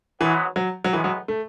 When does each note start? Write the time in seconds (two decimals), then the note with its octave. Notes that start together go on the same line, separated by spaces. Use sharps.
0.20 G#2 E3 F#3 B3
0.56 F#3
0.84 F#3
0.92 A2 E3 G#3 B3
1.04 F#3
1.28 A3